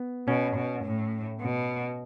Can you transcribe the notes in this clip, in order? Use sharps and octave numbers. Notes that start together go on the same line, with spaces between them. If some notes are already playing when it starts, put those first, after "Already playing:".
Already playing: B3
B2 C#4
B2
A2
B2